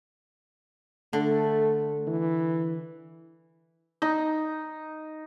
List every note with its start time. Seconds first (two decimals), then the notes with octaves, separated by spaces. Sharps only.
1.13 D3 A3
2.07 E3
4.02 D#4